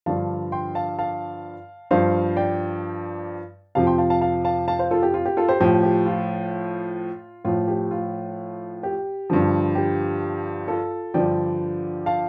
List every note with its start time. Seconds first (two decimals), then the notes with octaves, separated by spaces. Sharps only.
0.06 G2 D3 F3 F5 A5
0.52 G5 C6
0.75 F5 A5
0.99 F5 A5
1.91 G2 F3 C5 F5
2.36 D5 G5
3.75 F2 C3 F3 F5 A5
3.87 G5 C6
3.98 F5 A5
4.10 F5 A5
4.21 F5 A5
4.45 F5 A5
4.68 F5 A5
4.79 C5 F5
4.91 F4 A4
5.03 G4
5.14 F4
5.26 G4
5.37 F4 A4
5.49 G4 C5
5.60 A2 F3 G4
5.83 G4
6.06 F4
7.45 A2 F3 F4
7.68 G4
7.91 F4
8.83 G4
9.30 G2 D3 F3
9.75 G4
10.68 F4 A4
11.14 G2 D3 F3 D5 G5
12.06 F5 A5